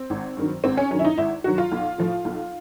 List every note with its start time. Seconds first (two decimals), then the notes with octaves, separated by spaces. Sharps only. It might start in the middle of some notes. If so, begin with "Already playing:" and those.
Already playing: C4
0.10 G#1
0.37 G2 D#3 F#3
0.64 G#1 C4
0.77 C#4
0.91 G2 D#3 F#3 C#4
0.99 E4
1.04 D#4
1.17 G#1 E4
1.44 G2 D#3 F#3 F#4
1.58 F4
1.72 B1
1.98 A2 F3
2.25 B1